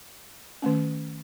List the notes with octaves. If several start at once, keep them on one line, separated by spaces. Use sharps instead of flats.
D#3 A3 C#4